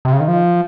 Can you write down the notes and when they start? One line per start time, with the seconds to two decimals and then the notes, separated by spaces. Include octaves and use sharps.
0.05 C3
0.13 C#3
0.20 D#3
0.28 F3